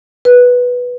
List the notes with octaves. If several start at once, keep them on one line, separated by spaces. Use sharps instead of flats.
B4